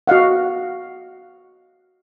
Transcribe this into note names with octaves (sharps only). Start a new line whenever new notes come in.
F#4 D#5 F5 F#5